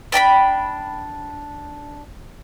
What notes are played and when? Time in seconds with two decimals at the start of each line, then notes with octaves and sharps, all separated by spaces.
0.12 D4 G5 A#5 B5